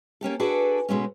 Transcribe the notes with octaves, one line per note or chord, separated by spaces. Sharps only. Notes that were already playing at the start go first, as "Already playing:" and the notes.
A#3 C#4 G4 A4
D4 F#4 G#4 A4 B4 D5
B2 G#3 A3 C#4